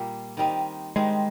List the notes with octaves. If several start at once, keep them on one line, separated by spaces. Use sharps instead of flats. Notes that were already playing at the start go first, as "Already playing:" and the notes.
Already playing: A#2 G3 A#3
D#3 G3 C4 D#4
D#3 G3 G#3 C4 D#4